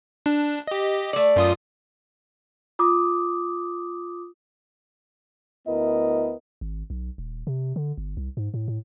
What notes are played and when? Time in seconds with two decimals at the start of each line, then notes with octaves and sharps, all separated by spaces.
0.26 D4
0.68 G4 D#5
1.13 A3 D5
1.36 F#2 F4 D#6
2.79 F4 D6 D#6
5.68 D2 B3 E4 A#4 D#5
6.61 G#1
6.90 B1
7.18 D#1
7.47 C3
7.76 D3
7.98 G1
8.17 C2
8.37 G#2
8.54 A2
8.68 A2